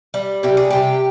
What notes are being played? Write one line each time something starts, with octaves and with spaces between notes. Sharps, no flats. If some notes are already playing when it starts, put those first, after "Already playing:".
G3
C3 G4
G#4
C3 G4